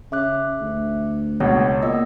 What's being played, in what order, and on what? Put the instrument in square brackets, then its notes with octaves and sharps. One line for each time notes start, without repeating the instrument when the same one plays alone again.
[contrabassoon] C#3 [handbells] E5 D6 F#6
[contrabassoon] D2
[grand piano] C#2 B2 [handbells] C#5
[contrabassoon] A#2 [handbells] B3 D#5 E6